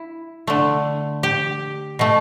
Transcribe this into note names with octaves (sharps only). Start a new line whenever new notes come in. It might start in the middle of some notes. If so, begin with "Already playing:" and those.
Already playing: E4
D3 A3
G4
B2 A3